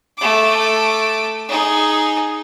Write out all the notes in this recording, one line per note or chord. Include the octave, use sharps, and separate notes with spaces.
A3 D6
D#4 G#4